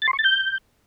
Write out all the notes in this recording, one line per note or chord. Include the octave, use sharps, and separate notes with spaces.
A6
C6
C#6
A6
G6